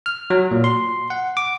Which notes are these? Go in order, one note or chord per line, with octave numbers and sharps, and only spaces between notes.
F6
F#3
A#2
C6
F#5
D6